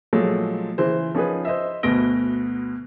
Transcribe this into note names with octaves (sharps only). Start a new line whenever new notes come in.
A#2 F3 F#3 G#3 A3
C#3 E3 C5
F3 C#4 D#4 G#4 B4
C5 D#5 E5
D2 B2 B3 A#6 D7 G7